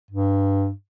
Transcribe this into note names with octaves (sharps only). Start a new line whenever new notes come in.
G2